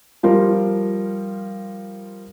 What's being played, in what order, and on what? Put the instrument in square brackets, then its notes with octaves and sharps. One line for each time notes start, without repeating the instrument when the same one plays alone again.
[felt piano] F3 G3 F4 A#4